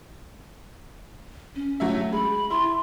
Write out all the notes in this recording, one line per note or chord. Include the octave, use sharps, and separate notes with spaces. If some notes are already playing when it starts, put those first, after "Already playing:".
C#4
F#3 A3 E5
G#3 B5
E4 C6